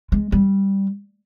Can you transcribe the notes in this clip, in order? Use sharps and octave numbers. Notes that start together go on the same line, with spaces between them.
G#3
G3